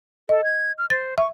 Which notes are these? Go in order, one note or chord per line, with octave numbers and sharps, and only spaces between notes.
A4 D#5
G#6
F6
C5 A6
E5 C#6